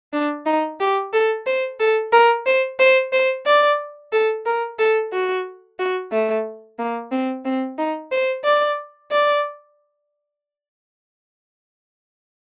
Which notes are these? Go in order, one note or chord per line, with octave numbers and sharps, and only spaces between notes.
D4
D#4
G4
A4
C5
A4
A#4
C5
C5
C5
D5
A4
A#4
A4
F#4
F#4
A3
A#3
C4
C4
D#4
C5
D5
D5